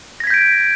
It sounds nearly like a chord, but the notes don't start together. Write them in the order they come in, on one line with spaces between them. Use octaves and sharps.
A#6 G#6 B6 G6 D7